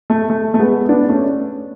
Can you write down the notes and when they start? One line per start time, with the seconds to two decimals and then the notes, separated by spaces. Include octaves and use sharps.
0.10 A3
0.30 A3
0.54 A3
0.59 G#3 B3
0.89 B3 D4
1.09 A3 C#4